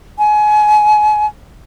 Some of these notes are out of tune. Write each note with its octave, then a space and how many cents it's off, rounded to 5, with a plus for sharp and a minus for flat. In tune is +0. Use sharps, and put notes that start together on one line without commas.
G#5 +30